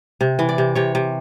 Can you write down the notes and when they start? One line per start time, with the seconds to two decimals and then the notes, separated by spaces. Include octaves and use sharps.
0.21 C3
0.39 E3
0.49 D5
0.58 C3
0.75 C3 C#5
0.95 C3